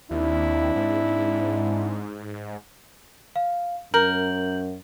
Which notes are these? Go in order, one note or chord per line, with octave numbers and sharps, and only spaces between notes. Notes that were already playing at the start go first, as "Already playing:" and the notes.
D#2 C4 D4 E4
G#2
F5
F#2 A#4 G6 F#7